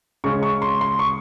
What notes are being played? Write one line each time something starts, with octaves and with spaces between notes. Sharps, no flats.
C#3 G#3 C#4 C#6
C#6
C6
C6
C#6